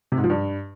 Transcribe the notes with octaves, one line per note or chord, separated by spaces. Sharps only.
C3
G#2
F3
G2